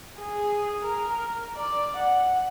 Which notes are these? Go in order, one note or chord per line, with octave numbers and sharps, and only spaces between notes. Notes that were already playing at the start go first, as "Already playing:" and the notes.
G#4
A#4
D5
F#5